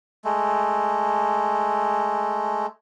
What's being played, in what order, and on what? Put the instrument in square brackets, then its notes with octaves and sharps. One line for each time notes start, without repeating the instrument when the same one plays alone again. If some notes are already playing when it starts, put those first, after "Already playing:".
[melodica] G#3 A3